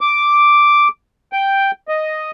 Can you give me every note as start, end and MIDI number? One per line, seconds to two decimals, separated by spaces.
0.01 0.88 86
1.33 1.71 79
1.88 2.31 75